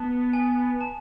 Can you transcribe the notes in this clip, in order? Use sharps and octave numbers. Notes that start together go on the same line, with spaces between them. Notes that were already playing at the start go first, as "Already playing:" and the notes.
Already playing: B3 A5
G#5
A5